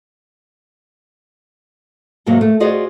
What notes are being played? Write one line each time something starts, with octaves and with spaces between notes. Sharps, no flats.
G#2 C3 D#3 F#3 A#3
A3
F4 F#4 G#4 C5 D5 D#5